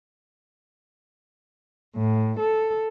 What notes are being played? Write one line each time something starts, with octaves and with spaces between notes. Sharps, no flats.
A2
A4